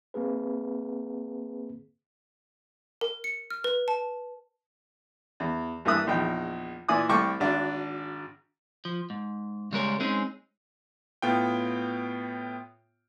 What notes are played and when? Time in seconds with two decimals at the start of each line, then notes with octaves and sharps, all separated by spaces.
0.14 A#3 C4 G#4 B4
3.01 A#4
3.24 C#7
3.50 F6
3.64 B4
3.88 A5
5.40 E2
5.85 G2 E3 A#3 E5 D#6 F#6
6.07 A#1 E2 D#4 G5
6.88 A#2 E3 E4 D5 G#5 D#6
7.09 C2 A3 G5 A5 C#6 D6
7.40 G#1 D4 F#4
8.85 F3
9.10 G#2
9.72 C#3 G3 G#3 A#4 C#5
10.00 G#3 C4 C#4 D#4 G#4
11.22 A2 B3 F4 G5